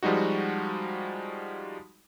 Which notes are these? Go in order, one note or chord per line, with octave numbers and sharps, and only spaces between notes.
F3 G3 G#3 D#4 F#4